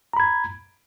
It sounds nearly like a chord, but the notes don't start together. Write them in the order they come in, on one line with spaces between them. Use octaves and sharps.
A#5 B5 G#6